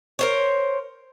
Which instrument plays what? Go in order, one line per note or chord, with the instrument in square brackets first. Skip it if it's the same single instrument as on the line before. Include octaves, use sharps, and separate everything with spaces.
[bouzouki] A#4 C5 C#5